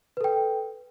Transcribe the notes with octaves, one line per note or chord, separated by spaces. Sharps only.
A4 B4 G5